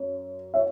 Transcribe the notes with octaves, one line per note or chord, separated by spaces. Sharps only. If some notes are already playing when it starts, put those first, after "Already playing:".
Already playing: F#2 C#5
C#5 E5